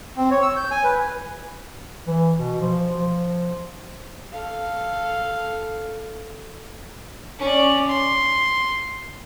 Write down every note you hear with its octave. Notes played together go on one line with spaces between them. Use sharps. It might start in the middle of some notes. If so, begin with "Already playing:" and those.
C4
C#5
E6
G6
G#5
B4
E3
B2
F3
F3
A4 F5
C#4 D5
C6